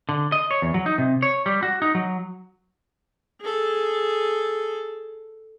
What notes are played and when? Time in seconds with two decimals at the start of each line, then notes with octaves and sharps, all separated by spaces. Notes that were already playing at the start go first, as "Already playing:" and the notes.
0.09 D3
0.32 D#5
0.51 C#5
0.62 E2
0.74 F#3
0.86 D#4
0.98 C3
1.23 C#5
1.46 G3
1.63 F#4
1.82 D#4
1.95 F#3
3.42 G#4 A4